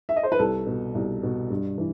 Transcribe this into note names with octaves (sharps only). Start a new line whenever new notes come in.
E5
D#5
C5
B4
C2 A4
B2
C2
B2
G2
E3